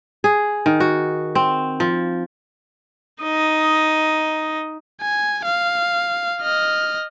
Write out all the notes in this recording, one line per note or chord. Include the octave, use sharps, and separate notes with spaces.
G#4
D#3
F#4
C4
F3
D#4 D#5
G#5
F5
D#5 F6